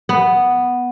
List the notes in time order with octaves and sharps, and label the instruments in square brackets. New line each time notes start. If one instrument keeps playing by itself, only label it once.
[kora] B3